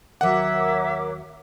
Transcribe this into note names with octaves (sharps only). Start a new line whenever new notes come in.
D#2 F#3 A#4 C#5 E5 F#5 D6